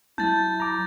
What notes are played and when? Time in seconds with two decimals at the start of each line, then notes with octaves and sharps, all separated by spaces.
0.18 F#3 E4 A5 G6 A6
0.60 A#5 D6